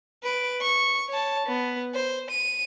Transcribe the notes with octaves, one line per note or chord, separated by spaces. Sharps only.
B4 D7
C#6
C#5 A5
B3
C5
D#7